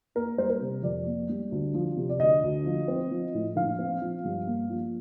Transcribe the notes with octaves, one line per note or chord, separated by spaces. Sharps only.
A#3 A#4
G3 C5
A#4
C3
F2 D5
A#3
G3
D2
F3
C3
D5
D2 D#5
D2
F3
C4
F3
A2
A#1 F5
C4
F3
G2
A#3
F3